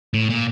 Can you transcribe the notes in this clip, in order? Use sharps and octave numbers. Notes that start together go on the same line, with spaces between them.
A2
A#2